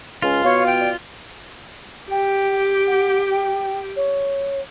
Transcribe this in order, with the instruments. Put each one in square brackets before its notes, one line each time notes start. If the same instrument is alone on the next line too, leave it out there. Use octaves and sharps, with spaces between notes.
[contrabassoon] C#2 [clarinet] C#4 [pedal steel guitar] F4
[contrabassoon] B2 [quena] C#5 [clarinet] F5
[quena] G5
[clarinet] D5
[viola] G4 [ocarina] G5
[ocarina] F#5
G5
C#5